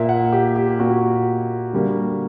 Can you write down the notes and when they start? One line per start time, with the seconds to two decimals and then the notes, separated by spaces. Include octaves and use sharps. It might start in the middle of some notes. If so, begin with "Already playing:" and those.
Already playing: A#2 A#3 E5
0.09 F#5
0.32 G4
0.56 G4
0.79 A#2 A#3 F#4
1.73 D3 G3 A#3